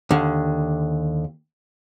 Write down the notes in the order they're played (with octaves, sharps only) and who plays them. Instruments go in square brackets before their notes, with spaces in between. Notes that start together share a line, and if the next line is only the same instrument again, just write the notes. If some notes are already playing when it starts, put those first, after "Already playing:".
[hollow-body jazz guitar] D#2 D3